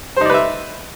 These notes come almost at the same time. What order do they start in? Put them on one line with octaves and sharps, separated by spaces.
C5 D#4 D5 B4 E5